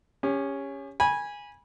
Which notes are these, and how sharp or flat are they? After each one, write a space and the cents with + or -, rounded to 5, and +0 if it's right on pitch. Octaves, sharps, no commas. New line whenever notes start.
C#4 +0 G4 +35
G#5 -10 B5 -25